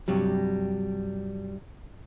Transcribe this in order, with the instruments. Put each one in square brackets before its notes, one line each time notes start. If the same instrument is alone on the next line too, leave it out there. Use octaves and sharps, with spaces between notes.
[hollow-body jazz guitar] G2 C3 F#3 G3